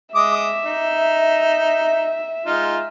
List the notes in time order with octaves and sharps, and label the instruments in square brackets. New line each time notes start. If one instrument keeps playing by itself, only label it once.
[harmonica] G#3 D6 D#6 [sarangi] E5
[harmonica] D#4
G#3 D#4 F4